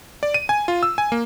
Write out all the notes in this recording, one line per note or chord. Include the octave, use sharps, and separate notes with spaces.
D5
D#7
G#5
F4
E6
G#5
A#3